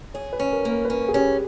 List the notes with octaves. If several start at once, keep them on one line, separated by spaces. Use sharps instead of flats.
G#4 C#5
B4
C#4
A#4
A#3
A#4
B4
C#4 A#4
G#4
C#4 G4